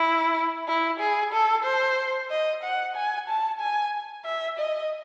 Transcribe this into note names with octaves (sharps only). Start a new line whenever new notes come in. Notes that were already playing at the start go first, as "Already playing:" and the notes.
Already playing: E4
E4
G#4
A4
C5
D#5
F#5
G#5
A5
G#5
E5
D#5